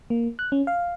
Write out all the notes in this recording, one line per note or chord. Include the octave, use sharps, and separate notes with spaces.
A#3
F#6
C#4
F5